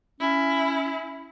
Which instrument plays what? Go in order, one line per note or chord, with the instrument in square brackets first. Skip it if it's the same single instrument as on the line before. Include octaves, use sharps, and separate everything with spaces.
[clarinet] C#4 [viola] E4